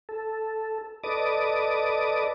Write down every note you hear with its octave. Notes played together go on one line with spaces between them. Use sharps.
A4
A4 B4 D5 D#5 D6 D#6